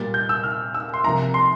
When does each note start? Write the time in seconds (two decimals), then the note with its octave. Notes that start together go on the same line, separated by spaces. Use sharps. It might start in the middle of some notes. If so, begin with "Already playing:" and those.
Already playing: A#2 G3 A#3 A6
0.14 G6
0.29 E6
0.43 F6
0.74 E6
0.94 C6
1.04 C2 C3 F3 A#3 A#5
1.34 C6